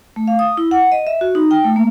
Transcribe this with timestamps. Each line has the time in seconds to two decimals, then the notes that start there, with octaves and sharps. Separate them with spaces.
0.16 A3
0.27 F5
0.39 D#6
0.57 E4
0.71 F#5
0.92 D#5
1.07 E5
1.21 F#4
1.35 D#4
1.51 G5
1.64 A3
1.76 A#3